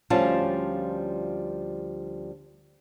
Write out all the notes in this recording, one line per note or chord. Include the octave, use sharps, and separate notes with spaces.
D2 F3 G3 C#4 F4 A5